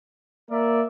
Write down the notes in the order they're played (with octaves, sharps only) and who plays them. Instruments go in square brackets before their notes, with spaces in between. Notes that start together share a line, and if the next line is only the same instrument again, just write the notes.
[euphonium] A#3 [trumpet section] A#4 D5 E5